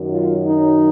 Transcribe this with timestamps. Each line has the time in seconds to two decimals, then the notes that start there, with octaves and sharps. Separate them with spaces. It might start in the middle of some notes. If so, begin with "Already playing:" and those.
Already playing: F#2 D#3 F#3
0.09 F4
0.46 D#4